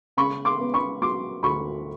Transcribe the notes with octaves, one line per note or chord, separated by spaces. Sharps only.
C#3 B5 C#6
C6 D6
B3
B5 C#6
F#3 C6 D6
D2 B5 C#6